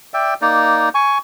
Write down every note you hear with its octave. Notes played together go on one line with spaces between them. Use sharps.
D5 E5 G5
A#3 D#4 D5
G#5 C#6